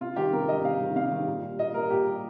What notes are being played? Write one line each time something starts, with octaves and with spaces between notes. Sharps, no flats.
C3 F4
D#3 G3 G4
C3 A#4
D#3 G3 D#5
C3 F5
D#3 G3
C3 F5
D#3 G3
A#2
G3
A#2 D#5
G3 A#4
A#2 G4
G3